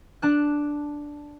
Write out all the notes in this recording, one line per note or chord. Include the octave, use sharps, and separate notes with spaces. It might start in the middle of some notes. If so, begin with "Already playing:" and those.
D4 A5 F#6